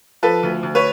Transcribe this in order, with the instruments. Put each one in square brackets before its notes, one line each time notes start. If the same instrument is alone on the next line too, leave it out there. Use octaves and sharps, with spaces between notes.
[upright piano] F3 A4 B4
D2
D2
B4 C#5